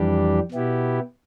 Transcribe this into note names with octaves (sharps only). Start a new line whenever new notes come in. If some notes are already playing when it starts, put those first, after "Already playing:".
Already playing: F2 E3 G3 D4 G4
B2 B3 E4 G4